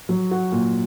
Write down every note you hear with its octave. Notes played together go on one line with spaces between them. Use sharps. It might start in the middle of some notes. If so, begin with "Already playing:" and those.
F#3
F#4
A#2